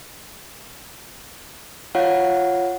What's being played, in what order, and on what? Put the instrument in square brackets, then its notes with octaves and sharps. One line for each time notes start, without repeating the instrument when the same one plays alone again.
[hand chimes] F4 C#5 F5 F#5